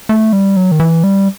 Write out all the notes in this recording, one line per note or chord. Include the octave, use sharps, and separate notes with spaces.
A3
G3
F#3
D#3
E3
G3